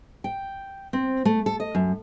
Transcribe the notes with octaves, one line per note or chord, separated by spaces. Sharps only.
G5
C4
A3
A4
D#5
F#2